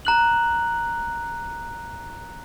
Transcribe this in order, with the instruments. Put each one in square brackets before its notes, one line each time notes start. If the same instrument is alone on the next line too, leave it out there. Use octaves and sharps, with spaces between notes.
[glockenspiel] A#5 F#6 F#7